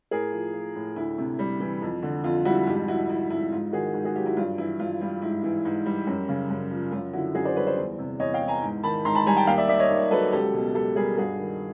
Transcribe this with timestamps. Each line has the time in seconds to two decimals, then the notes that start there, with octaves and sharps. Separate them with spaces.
0.11 A2 G#4 A#4
0.32 F3
0.53 F3
0.75 A2
0.96 D2 E4
1.18 C3
1.39 G3
1.60 E3
1.82 F2
2.02 D3
2.24 F2 F4
2.45 G3 E4 F#4
2.67 G#2 F4 G4
2.88 F3 E4 F#4
3.09 F3 E4
3.30 G#2 E4
3.52 G#2 F4
3.73 D#3 F#4 G#4
3.94 G#2
4.05 F#4 G#4
4.16 F#3 F4 G4
4.26 E4 F#4
4.37 G2 F4
4.58 E3 E4
4.80 G2 F4
5.01 G3 F4
5.22 G#2 E4
5.44 E3
5.65 G#2
5.86 G3
6.07 F#2
6.28 C#3
6.50 F#2
6.71 F3
6.92 F#2 F4
7.13 D3 E4 F#4
7.34 F#2 F#4 G#4
7.45 C5 D5
7.56 G3 B4 C#5
7.67 C5 D5
7.77 E2
7.99 C3
8.20 E2 C#5 D#5
8.34 F5 G5
8.42 E3
8.48 G#5 A#5
8.62 G#2
8.83 D#3 A5 B5
9.05 G#2 A#5 C6
9.15 A5 B5
9.26 G3 G#5 A#5
9.36 G5 A5
9.47 D#2 F5 G5
9.58 D5 E5
9.69 D#3 D5 E5
9.79 C#5 D#5
9.90 D#2
10.11 F#3 A4 B4
10.32 C#2 G4 A4
10.54 B2
10.75 C#2 G4 A4
10.96 G3 G#4 A#4
11.18 G2 F#4 G#4
11.39 D#3